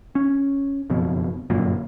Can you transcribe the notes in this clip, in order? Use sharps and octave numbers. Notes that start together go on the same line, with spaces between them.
C#4
F#1 F2 B2
G1 F#2 A#2